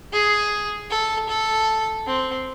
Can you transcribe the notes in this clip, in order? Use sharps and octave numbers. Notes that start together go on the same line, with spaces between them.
G#4
A4
A4
C4